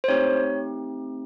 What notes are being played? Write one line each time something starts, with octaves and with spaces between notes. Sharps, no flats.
C5
A3 C4 D#4 G4 C#5